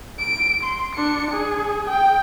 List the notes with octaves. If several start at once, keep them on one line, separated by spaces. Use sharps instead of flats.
D7
C6
D4 C#7
G#4
G5